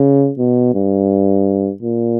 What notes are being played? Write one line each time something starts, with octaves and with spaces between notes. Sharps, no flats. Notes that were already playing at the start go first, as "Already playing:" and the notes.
Already playing: C#3
B2
G2
A#2